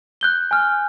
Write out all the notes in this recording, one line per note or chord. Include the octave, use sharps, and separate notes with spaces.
F#6 G6 G7
G#5 F6